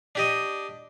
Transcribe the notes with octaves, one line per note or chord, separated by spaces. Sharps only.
D4 G4 D#5